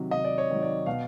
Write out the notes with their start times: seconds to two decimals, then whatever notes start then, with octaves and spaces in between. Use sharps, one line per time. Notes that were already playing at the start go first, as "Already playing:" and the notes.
Already playing: C3 D#3 F#3
0.11 C3 D#5
0.25 D5
0.38 C#5
0.50 D#3 F#3
0.62 D5
0.86 B2 F5